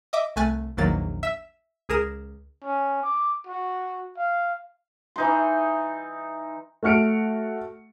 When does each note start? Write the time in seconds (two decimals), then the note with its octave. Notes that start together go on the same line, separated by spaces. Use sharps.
0.13 D#5 E5 D6
0.36 C2 A3 G#5 F#6 A6
0.77 A#1 E2 D#3 F#3 A#3 A6
1.23 E5 E7
1.89 C#2 G#4 A#4 D#6 E7
2.64 C#4
3.03 D6
3.47 F#4
4.17 F5
5.16 E3 D#4 C6
6.83 A3 F#4 F6 C#7 D7